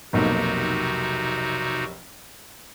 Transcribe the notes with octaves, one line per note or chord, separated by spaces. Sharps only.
F1 B1 C3 A#3 D#4 F#4